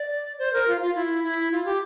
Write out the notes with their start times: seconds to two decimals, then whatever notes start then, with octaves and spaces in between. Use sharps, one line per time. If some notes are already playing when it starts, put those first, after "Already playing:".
Already playing: D5
0.39 C5
0.53 A#4
0.67 F4
0.81 F4
0.95 E4
1.24 E4
1.51 F4
1.65 G4